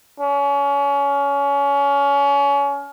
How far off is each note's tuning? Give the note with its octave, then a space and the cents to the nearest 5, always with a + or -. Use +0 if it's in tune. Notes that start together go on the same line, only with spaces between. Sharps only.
C#4 +30